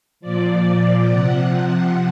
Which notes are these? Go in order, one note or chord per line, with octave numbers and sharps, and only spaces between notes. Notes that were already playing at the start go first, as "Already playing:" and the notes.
A#2 F3 D5
C3 F3 F#5